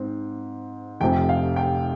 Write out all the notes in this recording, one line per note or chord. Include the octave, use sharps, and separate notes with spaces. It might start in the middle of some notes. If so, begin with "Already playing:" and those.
Already playing: G#2 C4
F1 F2 C3 G5
F5
G5